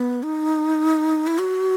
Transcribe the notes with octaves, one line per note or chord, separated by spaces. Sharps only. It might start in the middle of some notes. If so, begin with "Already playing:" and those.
Already playing: B3
D#4
E4
F#4